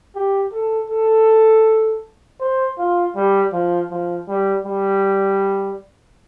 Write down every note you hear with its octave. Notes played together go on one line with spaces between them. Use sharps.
G4
A4
A4
C5
F4
G3
F3
F3
G3
G3